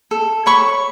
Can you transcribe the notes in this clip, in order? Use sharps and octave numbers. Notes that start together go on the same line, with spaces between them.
A4
C#5 B5 C#6